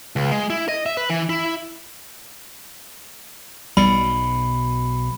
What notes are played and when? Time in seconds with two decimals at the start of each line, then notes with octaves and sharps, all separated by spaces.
0.16 C#2
0.31 G#3
0.50 E4
0.68 D#5
0.86 E5
0.97 B4
1.10 E3
1.29 E4
3.77 B1 B2 G3 B5